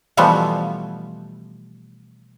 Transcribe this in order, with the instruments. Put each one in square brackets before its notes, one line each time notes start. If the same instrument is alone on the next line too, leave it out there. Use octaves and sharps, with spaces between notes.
[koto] B2 E3 F3 G3 A3 B3